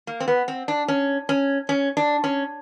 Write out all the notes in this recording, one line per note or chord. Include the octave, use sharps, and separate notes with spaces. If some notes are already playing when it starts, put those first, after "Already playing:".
A#3
C4
B3
C4
D4
C#4
C#4
C#4
D4
C#4